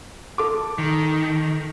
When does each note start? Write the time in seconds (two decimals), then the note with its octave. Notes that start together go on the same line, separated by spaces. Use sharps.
0.38 A4 D6
0.78 D#3